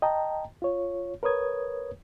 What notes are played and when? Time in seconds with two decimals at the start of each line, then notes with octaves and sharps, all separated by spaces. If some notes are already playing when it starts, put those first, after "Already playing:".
0.02 D#5 G5 A5 A#5
0.62 F4 C#5
1.23 A#4 B4 C#5 D#6 G#6